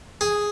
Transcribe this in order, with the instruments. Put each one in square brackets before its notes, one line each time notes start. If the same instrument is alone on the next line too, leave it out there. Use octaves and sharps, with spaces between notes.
[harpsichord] G#4